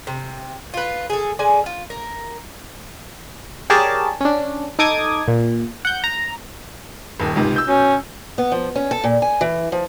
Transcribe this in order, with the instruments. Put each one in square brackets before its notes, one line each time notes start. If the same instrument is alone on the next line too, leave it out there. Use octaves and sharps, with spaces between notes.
[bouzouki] C3
F4 B4
G#4 A4
G#3 D5 G#5
F4
A#4
[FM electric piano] G4 G#4 A#4 C#5 D5 A5
C#4 D4
D#4 A4 D6 D#6 G#6
A#2
F#5 G6
A#5
[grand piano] D#1 D#2
C#2 G#2 C3
E6 G6
[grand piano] B2 [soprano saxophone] C#4
[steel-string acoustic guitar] B3
F3
C#4
A4
A#2
G#5
E3
F3